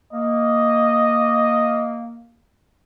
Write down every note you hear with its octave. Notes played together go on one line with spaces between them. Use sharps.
A#3 D#5